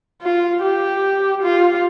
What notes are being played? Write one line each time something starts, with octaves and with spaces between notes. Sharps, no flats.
F4
G4
F4